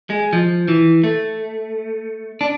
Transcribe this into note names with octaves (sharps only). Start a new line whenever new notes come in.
G#3
F3
E3
A3
D4